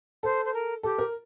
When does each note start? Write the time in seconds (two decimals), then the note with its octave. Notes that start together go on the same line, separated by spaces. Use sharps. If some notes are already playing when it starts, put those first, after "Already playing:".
0.23 A4 C5
0.45 C5
0.54 A#4
0.83 G4 A4
0.98 A#4